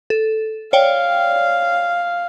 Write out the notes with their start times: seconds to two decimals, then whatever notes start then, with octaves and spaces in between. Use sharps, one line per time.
0.10 A4
0.73 C#5 D5 F5 G5